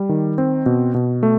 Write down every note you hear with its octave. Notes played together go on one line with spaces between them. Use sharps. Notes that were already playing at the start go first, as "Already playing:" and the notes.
Already playing: G3
D#3
C4
B2
B2
A3